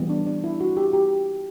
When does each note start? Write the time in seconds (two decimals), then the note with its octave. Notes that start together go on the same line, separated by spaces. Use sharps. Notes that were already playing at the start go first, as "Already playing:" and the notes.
Already playing: E3 G3 B3
0.10 D4
0.27 D4
0.44 E4
0.61 F#4
0.77 G4
0.93 G4